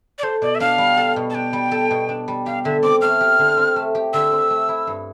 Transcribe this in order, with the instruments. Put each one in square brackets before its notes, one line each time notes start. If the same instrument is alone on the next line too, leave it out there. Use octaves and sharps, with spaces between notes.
[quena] D5
[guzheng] A4 [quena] C5
[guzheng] B2 [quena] D5
[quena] E5
[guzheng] D4 [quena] F5
[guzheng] G3
A4
B2
[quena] A5
[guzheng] D4 [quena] G5
[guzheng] G3
A4
B2
D4
G3
[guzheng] G4 [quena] F5
[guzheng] D3 [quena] E5
[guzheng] C4 [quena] D6
[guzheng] A3 [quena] F6
[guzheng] G4
D3
C4
A3
G4
[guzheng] D3 [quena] E6
[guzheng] C4
A3
E4
G2